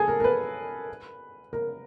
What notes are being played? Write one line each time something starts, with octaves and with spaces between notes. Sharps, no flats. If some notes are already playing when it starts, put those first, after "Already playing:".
Already playing: G#4 A4
A#4
A#4
B4
A#4